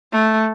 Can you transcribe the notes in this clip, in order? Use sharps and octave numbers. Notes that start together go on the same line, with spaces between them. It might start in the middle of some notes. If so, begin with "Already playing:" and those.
A3